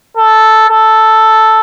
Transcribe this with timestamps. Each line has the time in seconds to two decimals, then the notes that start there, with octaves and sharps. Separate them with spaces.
0.17 A4
0.70 A4